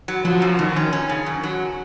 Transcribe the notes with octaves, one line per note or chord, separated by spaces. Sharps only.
F#3
F3 F#3
F#2
F#2 D#3
C#4
C#4
C#3
F#2
F#3